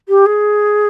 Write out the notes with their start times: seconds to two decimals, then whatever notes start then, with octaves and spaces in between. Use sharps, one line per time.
0.09 G4
0.26 G#4